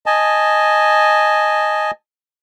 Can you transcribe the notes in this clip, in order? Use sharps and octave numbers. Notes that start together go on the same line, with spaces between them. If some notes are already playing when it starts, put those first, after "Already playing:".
D#5 G#5 A5